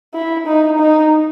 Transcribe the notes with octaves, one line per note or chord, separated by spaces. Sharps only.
E4
D#4
D#4